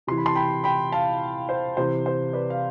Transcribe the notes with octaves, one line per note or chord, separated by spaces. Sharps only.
C3 E3 C6
B5
A5 C6
G5 B5
G5 B5
F5 A5
C5
C3 E3 C5
C5
B4 D5
F5